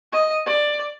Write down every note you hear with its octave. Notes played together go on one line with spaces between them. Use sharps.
D#5
D5